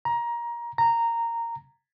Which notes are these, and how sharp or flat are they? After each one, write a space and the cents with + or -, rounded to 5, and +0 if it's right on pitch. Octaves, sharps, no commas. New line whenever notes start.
A#5 +20
A#5 -10